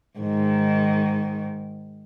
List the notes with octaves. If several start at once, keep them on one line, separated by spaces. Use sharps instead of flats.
G#2 D#3